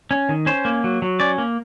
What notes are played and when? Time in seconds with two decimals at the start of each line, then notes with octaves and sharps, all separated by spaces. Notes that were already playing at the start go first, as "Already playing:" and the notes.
0.11 C#4
0.29 D#3
0.46 C#4 C5
0.65 A#3
0.84 F#3
1.02 F#3
1.20 C#4 D5
1.38 A#3